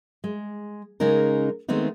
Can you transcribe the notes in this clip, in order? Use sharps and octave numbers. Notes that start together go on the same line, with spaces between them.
G#3
C#3 G#3 C#4 D#4 A#4
D#3 G#3 A3 B3 C4 D#4